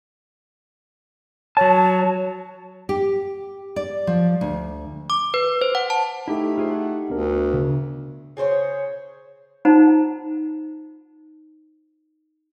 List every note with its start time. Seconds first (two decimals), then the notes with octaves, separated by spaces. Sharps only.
1.57 F#3 C#5 A5
2.89 G4
3.76 D5
4.07 F3
4.41 D2
5.10 D6
5.34 B4
5.61 C5
5.75 F#5
5.90 A5
6.28 A3 D#4 E4 G4 A4
6.58 F4 G#4 C5
6.71 F#5
7.10 D2 B3 D4 A#4
7.53 C#3
8.37 C#3 G#4 C5 C#5
9.65 D#4 F4 C5 F#5 A5 A#5